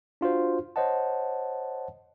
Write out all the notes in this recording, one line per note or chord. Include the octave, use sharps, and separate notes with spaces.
D4 F4 F#4 C5
C5 C#5 D#5 F#5 A5